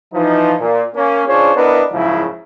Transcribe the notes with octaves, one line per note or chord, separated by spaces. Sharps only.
E3 F3 D#4
A#2
A#3 C#4
C#4 D4 F4 G#4 C5 C#5
B3 D4 E4 A#4 B4 D#5
F#1 G#2 C#3 F3 F#3 E4